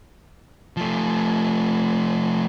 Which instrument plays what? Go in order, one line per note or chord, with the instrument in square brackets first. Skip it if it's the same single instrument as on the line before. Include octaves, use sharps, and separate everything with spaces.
[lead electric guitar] F3 A3